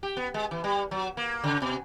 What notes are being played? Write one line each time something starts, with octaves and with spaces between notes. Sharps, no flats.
G4
B3
G#3
E3
G3
F#3
A#3
C#3
B2